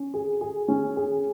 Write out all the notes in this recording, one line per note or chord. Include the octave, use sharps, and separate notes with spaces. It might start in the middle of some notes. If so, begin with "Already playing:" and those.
Already playing: C#4
G#4
G#4
C#4
G#4